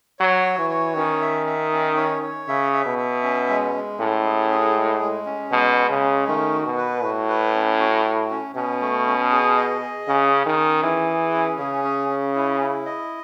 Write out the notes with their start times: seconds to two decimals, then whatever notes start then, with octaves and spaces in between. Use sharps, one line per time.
0.19 F#3 C#5
0.44 F#4
0.58 E3
0.70 C#5
0.95 D#3 C#4
1.21 E5
1.46 E5
1.72 C#4
1.96 C#5
2.23 C#5
2.48 C#3 E5
2.73 E5
2.86 B2
2.98 E5
3.23 C#4
3.49 G#3
3.75 G#3
3.99 A2 C#4
4.24 G#4
4.50 G#4
4.76 G#3
5.01 G#3
5.26 C#4
5.51 B2 G#3
5.77 G#3
5.89 C#3
6.03 C#4
6.27 D#3 A3
6.53 F#4
6.66 B2
6.77 B4
7.03 A2 F#4
7.28 B4
7.54 C#4
7.80 F#4
8.05 F#4
8.30 C#4
8.55 B2 C#4
8.81 A3
9.06 C#4
9.32 G#4
9.57 D#5
9.81 G#4
10.07 C#3 C#4
10.32 C#4
10.46 D#3
10.57 C#4
10.83 E3 G#4
11.09 G#4
11.34 C#4
11.59 C#3 G#4
11.84 C#4
12.10 C#4
12.36 E4
12.61 E4
12.86 D#5